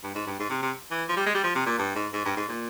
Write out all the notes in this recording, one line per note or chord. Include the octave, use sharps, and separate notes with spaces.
G2
G#2
G2
G#2
C3
C3
E3
F3
G3
G#3
G3
F3
C3
A#2
G2
G#2
G#2
G2
G#2
A#2